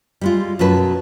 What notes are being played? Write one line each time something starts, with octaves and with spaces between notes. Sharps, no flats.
G3 G#3 F4
F#2 B2 F#3 B4 A5